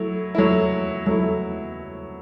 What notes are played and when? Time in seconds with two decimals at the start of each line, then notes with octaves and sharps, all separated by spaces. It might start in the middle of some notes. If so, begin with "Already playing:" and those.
Already playing: F#3 A3 E4
0.35 F#3 A3 E4
1.07 F#3 A3 E4